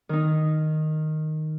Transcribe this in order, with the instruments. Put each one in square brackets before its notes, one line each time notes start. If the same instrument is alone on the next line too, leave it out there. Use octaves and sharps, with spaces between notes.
[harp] D#3 D#4